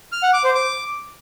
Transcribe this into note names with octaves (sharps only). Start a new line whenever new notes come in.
F6
F#5
D6
C5
D6